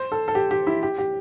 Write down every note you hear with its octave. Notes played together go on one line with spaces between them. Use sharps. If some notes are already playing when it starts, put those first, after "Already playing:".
Already playing: C5
A4
A4
G4
G4
E4
G4
G4